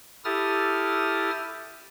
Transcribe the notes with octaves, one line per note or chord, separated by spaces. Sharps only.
E4 G4 A4 D#6 F6 A6